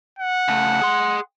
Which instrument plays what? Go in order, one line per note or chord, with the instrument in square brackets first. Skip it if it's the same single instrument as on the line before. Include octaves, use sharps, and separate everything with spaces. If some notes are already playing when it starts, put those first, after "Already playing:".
[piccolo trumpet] F#5
[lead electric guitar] C#3 A3
G#4 C6